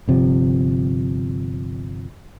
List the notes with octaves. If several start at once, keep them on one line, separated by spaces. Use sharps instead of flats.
G1 C3 F3